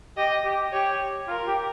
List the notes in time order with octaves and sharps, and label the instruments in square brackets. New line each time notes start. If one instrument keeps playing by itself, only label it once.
[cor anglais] G4 [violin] D#5
[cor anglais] G4
[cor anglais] G4 [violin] C#5
[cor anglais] F4 [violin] A#4
[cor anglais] G4